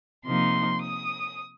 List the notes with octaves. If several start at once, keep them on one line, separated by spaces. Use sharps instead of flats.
C3 F3 A#3 D#4 C6
D#6